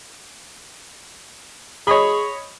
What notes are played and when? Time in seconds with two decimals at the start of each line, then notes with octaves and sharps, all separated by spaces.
1.87 G#4 C#5 D#5 B5